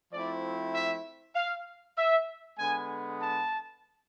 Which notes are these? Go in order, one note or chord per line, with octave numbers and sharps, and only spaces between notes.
F3 A3 C4 E4 D5
E5
F5
E5
D3 G#3 B3 G#5
A5